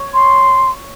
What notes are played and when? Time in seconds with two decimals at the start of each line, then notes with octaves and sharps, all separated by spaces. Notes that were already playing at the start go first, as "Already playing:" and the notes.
Already playing: C#5
0.14 C6